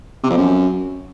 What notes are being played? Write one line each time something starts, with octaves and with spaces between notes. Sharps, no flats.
C3
F2
F#2